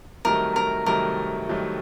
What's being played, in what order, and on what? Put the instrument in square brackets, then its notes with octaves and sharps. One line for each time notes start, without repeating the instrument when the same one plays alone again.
[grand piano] C2 C3 D#3 F#3 A3 [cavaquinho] A#4
[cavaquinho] A#4
[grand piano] C2 C3 D#3 F#3 A3 [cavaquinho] A#4
[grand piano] C2 C3 D#3 F#3 A3